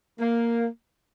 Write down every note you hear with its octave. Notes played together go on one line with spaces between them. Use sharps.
A#3